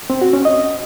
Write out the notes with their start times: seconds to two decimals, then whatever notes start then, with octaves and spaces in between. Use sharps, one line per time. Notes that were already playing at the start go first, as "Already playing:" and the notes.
0.10 C4
0.21 F#4
0.33 C#4
0.45 D#5